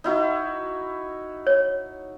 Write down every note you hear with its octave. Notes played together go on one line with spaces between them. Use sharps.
D#4 E4 F#4
C#5